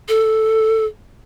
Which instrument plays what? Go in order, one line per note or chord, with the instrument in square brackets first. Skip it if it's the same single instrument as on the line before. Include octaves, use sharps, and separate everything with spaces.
[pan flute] A4